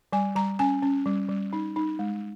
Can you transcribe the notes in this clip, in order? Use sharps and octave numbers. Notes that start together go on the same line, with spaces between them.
G3 G#5
G3 A#5
C#4 G#5
C#4
G3
G3
D#4
D#4
G#3